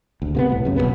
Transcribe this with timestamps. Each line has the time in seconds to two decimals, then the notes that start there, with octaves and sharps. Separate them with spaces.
0.22 D2
0.35 C3 A#3 B3
0.49 B1 A2
0.65 F#2 C#3
0.76 E1 E2 B2 B3